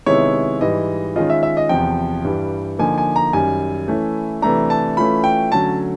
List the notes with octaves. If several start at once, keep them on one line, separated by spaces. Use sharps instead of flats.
C3 D#3 G#3 B3 E4 C#5
G#2 E3 G3 D#5
D#3 G#3 C#4 F4 D#5
E5
E5
D#5
E2 C3 F3 G5
G2 E3 G3
D3 F3 A#3 D#4 G#5
G#5
A#5
F#2 D#3 G3 G#5
E3 A3 C#4 E4
C3 E3 A3 D4 A#5
A5
E3 A3 C#4 F4 B5
G5
D3 F#3 A3 C#4 A5